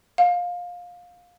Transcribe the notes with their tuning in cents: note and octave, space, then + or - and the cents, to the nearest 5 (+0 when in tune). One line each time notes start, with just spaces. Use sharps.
F5 +20